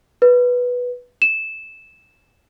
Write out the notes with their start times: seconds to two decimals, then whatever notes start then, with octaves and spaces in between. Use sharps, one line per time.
0.22 B4
1.22 E7